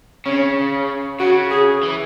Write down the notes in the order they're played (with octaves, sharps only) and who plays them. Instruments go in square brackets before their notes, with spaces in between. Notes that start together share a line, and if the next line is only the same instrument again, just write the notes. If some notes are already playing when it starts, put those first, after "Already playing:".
[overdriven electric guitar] C#3 [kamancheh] C#4
[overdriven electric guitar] C#3 [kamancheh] F#4
[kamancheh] G#4
[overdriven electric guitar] E3